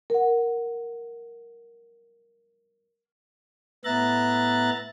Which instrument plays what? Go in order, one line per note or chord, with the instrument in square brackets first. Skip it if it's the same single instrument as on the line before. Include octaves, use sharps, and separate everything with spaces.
[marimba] A#4 F#5
[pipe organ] A2 B3 E5 A#5 F#6 A6